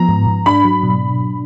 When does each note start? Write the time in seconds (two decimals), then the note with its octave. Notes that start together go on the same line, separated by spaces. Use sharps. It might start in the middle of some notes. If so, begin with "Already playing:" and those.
Already playing: F3 B3 A#5
0.09 G#2
0.27 G#2
0.46 D4 B5
0.65 F#3
0.83 B2